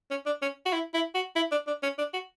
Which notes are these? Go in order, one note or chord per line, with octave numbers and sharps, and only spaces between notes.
C#4
D4
C#4
F#4
E4
E4
F#4
E4
D4
D4
C#4
D4
F#4